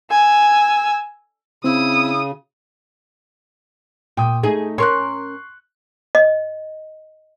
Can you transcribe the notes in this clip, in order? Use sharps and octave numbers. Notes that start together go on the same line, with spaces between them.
G#5 E6
C#3 C4 E4 D#6
A#2 G5 D#6
A3 D#4 G#4
C#4 A#4 C6 C#6 F#6
D#5